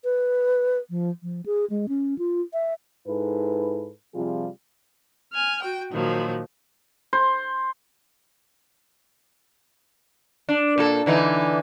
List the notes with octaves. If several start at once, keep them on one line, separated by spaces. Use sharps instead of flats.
B4
F3
F3
G#4
G#3
C#4
F4
E5
G#2 E4 A4 B4
C3 F3 G3 F4 G#4
G#5 F6
F#4 G5
A#2 D#3 F3 F#3
C5
D4
A#2 A#3 A4
D3 E3 D#4